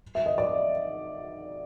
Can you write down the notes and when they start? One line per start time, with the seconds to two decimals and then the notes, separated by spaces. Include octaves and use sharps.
0.15 E5
0.26 D#5
0.38 D5